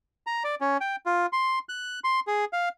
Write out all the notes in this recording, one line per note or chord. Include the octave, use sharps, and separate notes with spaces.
A#5
D5
C#4
G5
F4
C6
F#6
C6
G#4
F5